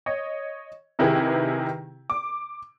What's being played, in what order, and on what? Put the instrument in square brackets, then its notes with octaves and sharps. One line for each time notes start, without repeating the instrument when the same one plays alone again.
[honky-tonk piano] C#5 D#5
C3 D#3 E4 G4 G#4 B4
D6